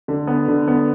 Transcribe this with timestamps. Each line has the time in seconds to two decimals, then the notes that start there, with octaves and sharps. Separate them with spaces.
0.08 D3
0.27 B3
0.48 D3
0.68 B3